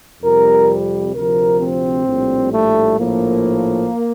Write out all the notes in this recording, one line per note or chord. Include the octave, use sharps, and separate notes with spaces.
F2 C3 G3 A#4
D2 C3 F3 A#4
C4
A#1 A2 G3
A3
A#1 A2 F3 A#3